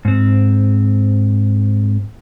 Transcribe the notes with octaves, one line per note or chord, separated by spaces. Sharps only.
G#2 C4